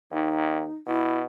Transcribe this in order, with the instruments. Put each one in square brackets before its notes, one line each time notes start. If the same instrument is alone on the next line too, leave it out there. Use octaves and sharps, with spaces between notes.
[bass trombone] D#2 [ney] D#4
[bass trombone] B2 [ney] E4